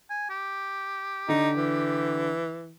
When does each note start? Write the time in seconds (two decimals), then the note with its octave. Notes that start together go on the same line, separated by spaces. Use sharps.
0.10 G#5
0.30 G4
1.29 D3 D#4
1.56 E3